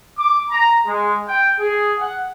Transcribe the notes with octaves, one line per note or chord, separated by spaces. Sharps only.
D6
A#5
G#3
G5
G#4
F#5